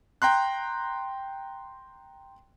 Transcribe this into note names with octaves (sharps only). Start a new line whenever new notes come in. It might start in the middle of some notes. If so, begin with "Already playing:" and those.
G5 A#5 C6 F#6